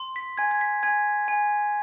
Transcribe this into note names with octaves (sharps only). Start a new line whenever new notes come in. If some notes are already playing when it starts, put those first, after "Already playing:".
Already playing: C6
B6
G#5 G#6
G#6
B6
G#5 G#6
G#5